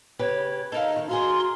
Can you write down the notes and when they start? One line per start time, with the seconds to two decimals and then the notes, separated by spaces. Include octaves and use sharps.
0.19 C#3 G4 B4 C#5
0.72 D#4 A4 A#4 D#5 F5
0.96 D#3
1.09 F#4 G#4 A#4 F5 C6